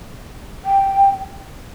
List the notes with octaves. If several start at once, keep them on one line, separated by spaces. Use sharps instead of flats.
G5